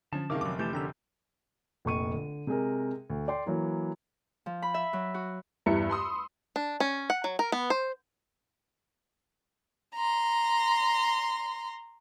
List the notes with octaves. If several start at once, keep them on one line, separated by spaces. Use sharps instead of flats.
D3 F3 C#4 A5
C3 D#3 G#3 A#4 F5 A5 D6
F1 C3 F#3 D6
E3 A3 G4 A5 G6
D3 B3 C#4 G4 A#4 G5 A#5 E6
F1 A#1 C#6 D#7
D3
C3 G#3 G#4 A#4
D2
D5 G5 C6
E3 F#3 A#3
F3
B5
E5
F#3
F#4
E2 G2 E4 E5 C#7
B5 C6 D#6 E6
D4
C#4
F#5
F#3
A#4
B3
C5
A#5 C6